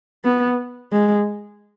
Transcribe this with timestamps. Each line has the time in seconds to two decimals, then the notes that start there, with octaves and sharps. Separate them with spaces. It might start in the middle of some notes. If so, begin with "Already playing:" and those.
0.24 B3
0.92 G#3